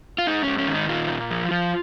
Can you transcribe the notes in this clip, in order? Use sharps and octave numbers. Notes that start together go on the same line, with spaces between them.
F4
G#2 D#4
G#2 C#4
C#4
D#3
D#4
A#2 F4
A#2
F3
F3